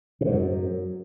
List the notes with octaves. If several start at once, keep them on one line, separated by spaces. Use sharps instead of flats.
C3
G#2
F#2